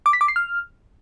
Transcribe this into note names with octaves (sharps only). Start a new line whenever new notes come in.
D6
B6
D6
C7
F6